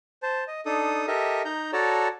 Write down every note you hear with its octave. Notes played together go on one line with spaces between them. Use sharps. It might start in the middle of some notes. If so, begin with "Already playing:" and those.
C5 A5
D#5
D4 D#4 A4 D#6
G4 A4 A#4 D#5 E5
D#4 A#5 G6
F#4 A4 C#5 D5 A5 A#5